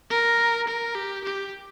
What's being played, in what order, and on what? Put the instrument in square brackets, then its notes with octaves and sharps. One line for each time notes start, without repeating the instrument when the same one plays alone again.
[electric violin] A#4
A#4
G4
G4